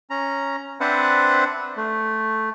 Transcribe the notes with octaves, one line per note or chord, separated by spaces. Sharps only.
C#4 A#5
C4 D4 B4 C5 E5 F#5
A3